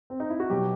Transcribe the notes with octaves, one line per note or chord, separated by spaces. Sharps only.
C4
D#4
E4
F#4
B2 F#3 G4